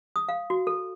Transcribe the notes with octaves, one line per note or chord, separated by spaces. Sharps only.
D#6
F5
F#4
A4